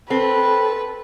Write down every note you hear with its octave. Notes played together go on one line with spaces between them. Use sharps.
C4 A4 B4